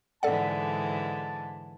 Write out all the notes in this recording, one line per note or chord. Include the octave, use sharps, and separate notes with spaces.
G#2 D3 E3 A4 D5 F#5 A5